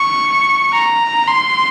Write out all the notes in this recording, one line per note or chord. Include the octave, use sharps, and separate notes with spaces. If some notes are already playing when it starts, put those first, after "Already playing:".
Already playing: C#6
A#5
C6